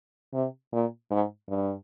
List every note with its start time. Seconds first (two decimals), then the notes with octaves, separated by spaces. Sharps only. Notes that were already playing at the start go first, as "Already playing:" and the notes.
0.33 C3
0.73 A#2
1.11 G#2
1.49 G2